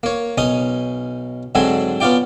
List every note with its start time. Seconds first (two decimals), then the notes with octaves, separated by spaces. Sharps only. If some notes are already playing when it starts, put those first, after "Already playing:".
0.03 A#3 C#5
0.38 B1 C#4 D#4 D#6
1.55 G#2 D3 F#3 C4 G#5
2.00 B3 C#4 F4 D5 G5